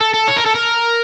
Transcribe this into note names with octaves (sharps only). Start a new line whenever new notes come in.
A4
A4
C#5
A#4
A4
A#4